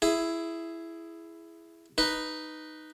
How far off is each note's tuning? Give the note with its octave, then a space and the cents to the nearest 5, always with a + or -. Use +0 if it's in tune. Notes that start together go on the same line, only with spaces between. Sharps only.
E4 +10 G#4 +5
D#4 -5 B4 +0